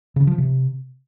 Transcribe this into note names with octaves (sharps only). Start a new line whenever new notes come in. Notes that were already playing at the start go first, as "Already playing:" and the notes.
C#3
F3
C3